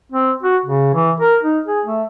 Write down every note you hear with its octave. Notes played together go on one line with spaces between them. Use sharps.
C4
F#4
C#3
E3
A#4
D#4
G#4
A3